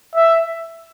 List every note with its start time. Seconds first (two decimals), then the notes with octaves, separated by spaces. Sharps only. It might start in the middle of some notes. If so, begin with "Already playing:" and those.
0.15 E5